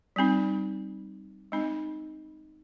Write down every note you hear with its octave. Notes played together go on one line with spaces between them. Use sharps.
G3 C4 D#4
G#3 C4 D#4